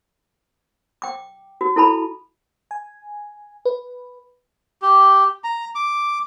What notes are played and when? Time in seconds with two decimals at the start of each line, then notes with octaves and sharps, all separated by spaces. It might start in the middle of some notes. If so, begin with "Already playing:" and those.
1.02 G5 D6
1.61 F#4
1.76 E4 A4 A5 B5
2.71 G#5
3.65 B4
4.82 G4
5.44 A#5
5.75 D6